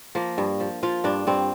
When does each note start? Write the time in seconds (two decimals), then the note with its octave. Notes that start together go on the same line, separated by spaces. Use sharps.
0.15 F3 A#3
0.38 G2
0.60 F3
0.83 F3 F4
1.04 G2 D4
1.27 G2 C4